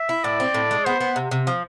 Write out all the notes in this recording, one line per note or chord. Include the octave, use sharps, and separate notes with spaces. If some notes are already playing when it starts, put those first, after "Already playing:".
Already playing: E5
E4
A2 D5
C4
A2
G#3
B3 C5
B3
C3
C3
F3